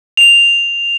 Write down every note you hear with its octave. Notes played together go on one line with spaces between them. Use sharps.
F7